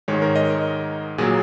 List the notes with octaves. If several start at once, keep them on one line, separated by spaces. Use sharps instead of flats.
G#2 D#3 G#3 C#5
A#4
D#5
A#4
A#2 F#3 A#3 G#4